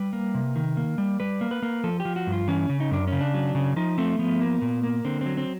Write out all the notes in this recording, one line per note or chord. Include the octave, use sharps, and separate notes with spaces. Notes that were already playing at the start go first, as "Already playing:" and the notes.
Already playing: G3 B4
A#3
C3
D#3
A#3
G3
G3 B4
A#3
B4
A#3
F3 A4
G4
F3
F#4
G2
F4
E3 C#4
C#3
D#4
F#2 D4
C#3 C#4
D4
F#3
C#3
F3 D#4
A3 C4
F3 B3
A#3
A#2
A#3
D3 C4
F#3 C4
C4